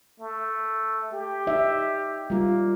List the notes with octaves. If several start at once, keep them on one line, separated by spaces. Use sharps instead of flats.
A3
G4
D#4 E5
G3 A#3 F4